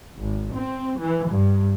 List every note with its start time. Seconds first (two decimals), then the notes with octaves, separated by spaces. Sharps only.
0.19 G#1
0.55 C4
0.99 E3
1.31 G2